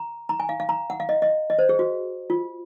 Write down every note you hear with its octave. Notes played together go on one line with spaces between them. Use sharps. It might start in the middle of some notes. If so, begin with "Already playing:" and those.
Already playing: A#5
A#5
G#5
F5
F5
A#5
F#5
F5
D#5
D#5
D#5
C5
G#4
F#4
F4